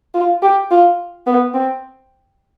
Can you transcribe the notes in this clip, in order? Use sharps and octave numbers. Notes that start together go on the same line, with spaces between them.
F4
G4
F4
B3
C4